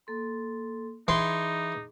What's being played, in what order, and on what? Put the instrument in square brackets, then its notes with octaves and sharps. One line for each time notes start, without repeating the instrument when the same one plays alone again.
[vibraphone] A#3 A4 C6
[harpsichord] E3 C6 [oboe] D#4 [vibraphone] G#4 D6